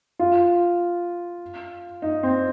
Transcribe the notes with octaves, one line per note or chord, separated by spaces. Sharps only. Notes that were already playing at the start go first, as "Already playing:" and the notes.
F4
D#4
C4